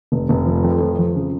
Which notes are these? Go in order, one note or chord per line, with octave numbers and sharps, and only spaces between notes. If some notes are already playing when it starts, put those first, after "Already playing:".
F1
F1
F3
F2
F3
F3
C#3